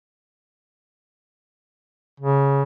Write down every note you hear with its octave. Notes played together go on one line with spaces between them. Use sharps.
C#3